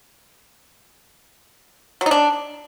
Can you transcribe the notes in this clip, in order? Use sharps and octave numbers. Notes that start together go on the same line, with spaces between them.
F#3
D#4
D4